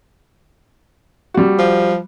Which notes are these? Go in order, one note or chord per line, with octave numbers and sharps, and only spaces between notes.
G3 F#4
F3